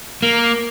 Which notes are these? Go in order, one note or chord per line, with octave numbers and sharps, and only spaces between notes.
A#3